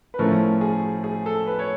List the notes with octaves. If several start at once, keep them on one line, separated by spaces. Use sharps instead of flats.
B4
A2 F3 A3 C#4 A#4
G#4
G#4
A4
B4
C#5